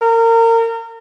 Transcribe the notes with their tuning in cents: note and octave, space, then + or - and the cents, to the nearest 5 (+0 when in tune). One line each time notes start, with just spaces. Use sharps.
A#4 -30